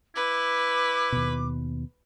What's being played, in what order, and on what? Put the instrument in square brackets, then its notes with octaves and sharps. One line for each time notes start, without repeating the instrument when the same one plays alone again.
[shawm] E4 [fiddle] B4 [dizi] D6
[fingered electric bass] D#2 B2